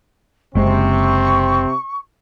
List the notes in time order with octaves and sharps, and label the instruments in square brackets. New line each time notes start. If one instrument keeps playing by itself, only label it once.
[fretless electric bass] F#1 G#3 [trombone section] C3 C4 [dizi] C#6